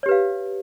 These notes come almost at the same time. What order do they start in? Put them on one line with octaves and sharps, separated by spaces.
C#5 G4 B4 F5